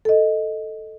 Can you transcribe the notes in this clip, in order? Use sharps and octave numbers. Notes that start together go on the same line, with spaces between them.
A4 D#5